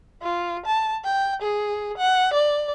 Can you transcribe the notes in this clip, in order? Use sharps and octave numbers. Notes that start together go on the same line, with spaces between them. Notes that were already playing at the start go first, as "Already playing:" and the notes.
F4
A5
G5
G#4
F#5
D5